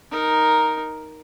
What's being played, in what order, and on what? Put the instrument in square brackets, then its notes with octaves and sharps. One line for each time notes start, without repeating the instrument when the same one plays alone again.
[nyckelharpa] D#4 A#4